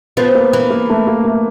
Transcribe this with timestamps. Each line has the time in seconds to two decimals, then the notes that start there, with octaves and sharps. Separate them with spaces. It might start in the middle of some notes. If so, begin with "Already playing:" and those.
0.17 F3 B3
0.35 A#3
0.53 E3 A#3
0.70 A#3
0.90 A3
1.07 A#3
1.25 A3